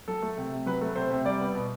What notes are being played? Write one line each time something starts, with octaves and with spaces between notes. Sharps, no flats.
F#3 A4
A3
C3
C3
F#3 B4
A3
C3 C5
C3
G3 D5
B3
B2